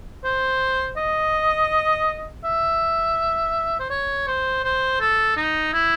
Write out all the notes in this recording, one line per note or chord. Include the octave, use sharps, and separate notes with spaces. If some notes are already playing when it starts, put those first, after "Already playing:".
C5
D#5
E5
C5
C#5
C5
C5
A4
D#4
E4